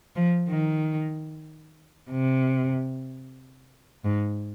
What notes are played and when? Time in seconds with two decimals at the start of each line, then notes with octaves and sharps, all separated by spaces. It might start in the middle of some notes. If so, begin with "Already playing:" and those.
0.16 F3
0.49 D#3
2.11 C3
4.04 G#2